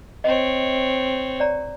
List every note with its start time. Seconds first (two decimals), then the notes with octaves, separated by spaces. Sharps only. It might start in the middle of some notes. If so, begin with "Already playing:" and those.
0.24 C4 C#5 D#5
1.40 C#5 D5 A#5